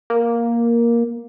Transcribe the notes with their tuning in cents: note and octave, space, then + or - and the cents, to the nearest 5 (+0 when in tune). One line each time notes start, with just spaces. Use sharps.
A#3 +5